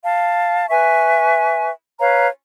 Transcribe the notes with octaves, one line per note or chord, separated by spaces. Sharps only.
F5 A5
B4 E5 G#5 C#6
B4 C#5 F5 A#5